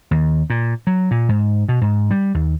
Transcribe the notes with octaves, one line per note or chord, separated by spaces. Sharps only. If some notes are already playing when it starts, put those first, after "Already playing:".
D#2
A#2
F#3
A#2
G#2
B2
G#2
G3
D#2